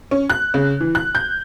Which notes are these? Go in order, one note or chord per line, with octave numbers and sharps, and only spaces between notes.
C#4
F#6
C#3
E3
F#6
G6